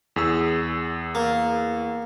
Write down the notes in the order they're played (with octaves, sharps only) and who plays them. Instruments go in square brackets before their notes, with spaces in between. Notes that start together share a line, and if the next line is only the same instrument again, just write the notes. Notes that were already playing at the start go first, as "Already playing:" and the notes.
[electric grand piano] E2 G#4 E6
[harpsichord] A#3